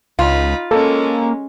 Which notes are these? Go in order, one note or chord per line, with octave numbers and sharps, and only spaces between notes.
C#2 D#4 F4 B5
G#3 A#3 C#4 A4